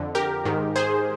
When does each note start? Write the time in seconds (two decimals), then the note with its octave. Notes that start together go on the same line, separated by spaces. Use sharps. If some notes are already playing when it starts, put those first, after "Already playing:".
Already playing: F2 D3
0.15 G4 A#4
0.45 G#2 D#3
0.76 G#4 C5